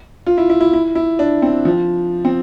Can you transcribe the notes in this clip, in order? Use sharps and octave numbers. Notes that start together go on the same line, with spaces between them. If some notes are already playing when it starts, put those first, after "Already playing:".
F4
E4
E4
E4
E4
E4
D4
C4
F3
C4